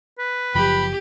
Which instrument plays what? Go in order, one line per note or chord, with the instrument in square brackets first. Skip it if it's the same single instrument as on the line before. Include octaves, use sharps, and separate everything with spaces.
[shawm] B4
[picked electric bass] F#1 F3 [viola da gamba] G4 [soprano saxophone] B5